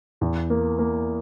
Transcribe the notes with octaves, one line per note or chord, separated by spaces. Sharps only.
E2
A#3
A#3